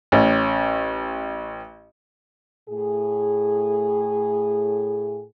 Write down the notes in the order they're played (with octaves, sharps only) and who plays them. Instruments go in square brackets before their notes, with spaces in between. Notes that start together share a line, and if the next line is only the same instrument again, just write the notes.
[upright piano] A1 C#4
[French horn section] A2 G#4